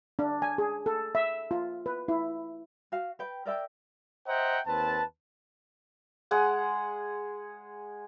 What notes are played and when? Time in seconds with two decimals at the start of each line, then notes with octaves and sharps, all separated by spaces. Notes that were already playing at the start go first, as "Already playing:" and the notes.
0.19 D4
0.42 G#5
0.58 G#4
0.86 A4
1.15 E5
1.51 F4
1.86 B4
2.08 E4
2.92 F#4 F5
3.19 B4 G5
3.45 A#4 D5 E5 G5
4.27 C5 D#5 E5 F#5 G5 A#5
4.67 D#2 C4 B4 A5
6.31 G#3 G#4 F#5